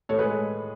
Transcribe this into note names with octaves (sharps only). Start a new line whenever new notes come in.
A2 A4 C#5
G#4 B4
G#3